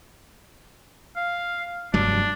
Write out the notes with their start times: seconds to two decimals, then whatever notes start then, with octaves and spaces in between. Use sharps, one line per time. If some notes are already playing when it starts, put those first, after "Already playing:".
1.16 F5
1.94 F1 G2 F#3 D4